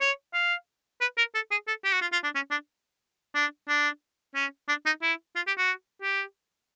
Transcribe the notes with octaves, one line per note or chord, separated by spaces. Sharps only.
C#5
F5
B4
A#4
A4
G#4
A4
G4
F#4
F4
F4
D4
C#4
D4
D4
D4
C#4
D4
D#4
E4
F4
G4
F#4
G4